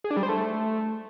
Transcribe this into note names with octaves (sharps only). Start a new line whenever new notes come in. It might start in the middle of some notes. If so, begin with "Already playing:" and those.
G#4
D4
G3
C5
A3